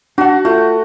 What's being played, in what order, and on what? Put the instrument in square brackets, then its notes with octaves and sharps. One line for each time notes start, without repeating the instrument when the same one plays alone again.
[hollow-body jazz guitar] D4 F#5 [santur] F#4 A5
[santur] A3 [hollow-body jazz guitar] F4